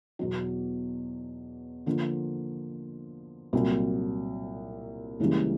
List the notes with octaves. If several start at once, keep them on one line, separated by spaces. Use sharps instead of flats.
E2 B2 F#3
D3 F3 A#3
C2 A#2 F#3
C#2 C#3 E3 G3 A#3